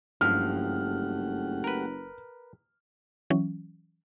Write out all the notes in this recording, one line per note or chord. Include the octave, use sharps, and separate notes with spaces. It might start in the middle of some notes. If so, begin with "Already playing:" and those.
F#1 G2 F3 A3 G4 F#5 F6
A#4 B4
E3 F#3 C#4